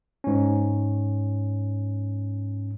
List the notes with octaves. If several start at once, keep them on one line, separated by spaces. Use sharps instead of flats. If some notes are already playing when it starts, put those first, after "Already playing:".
G#2 C#4